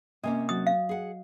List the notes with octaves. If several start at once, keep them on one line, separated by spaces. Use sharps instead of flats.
C3 A#3 C#4 D#5 G#5
F#3 F#4 D#6 A6
F5
G#4 F#5